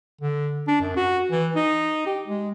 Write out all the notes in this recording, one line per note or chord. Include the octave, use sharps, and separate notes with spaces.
D3
D4
F#2
F#4
E3
D#4
G4
G#3